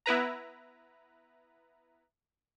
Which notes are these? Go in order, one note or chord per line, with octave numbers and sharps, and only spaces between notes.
B3 E4 B4 A#5